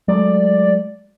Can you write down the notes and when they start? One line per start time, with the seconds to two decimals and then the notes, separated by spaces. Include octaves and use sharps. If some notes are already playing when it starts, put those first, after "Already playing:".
0.08 F#3 G#3 A3 D5